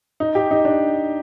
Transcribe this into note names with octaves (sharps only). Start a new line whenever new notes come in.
D#4
G4
D#4
D4